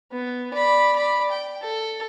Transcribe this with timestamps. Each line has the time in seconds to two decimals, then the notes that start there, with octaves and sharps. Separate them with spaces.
0.12 B3
0.53 D5 B5
0.95 D5 B5
1.31 G5
1.62 A4